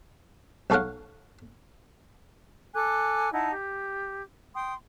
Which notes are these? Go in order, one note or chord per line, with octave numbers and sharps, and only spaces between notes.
B1 F#4 A4 C#5 F5 F#5
A4 G#5 D6 F#6
D#4 E4 F#5 A5
G4
G5 C6 D#6